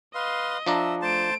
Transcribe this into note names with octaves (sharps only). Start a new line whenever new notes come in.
B4 D#5 F5 C6
F3 D4 E5 A#5
A3 C5 A5 D7